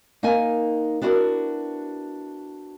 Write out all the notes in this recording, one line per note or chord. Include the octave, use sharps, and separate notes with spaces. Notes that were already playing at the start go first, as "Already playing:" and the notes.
A#3 D#4 A#4 D#5 G#5
B3 D4 E4 F#4 A#4